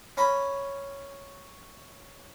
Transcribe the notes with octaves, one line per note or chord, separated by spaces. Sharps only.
C#4 A#5 B5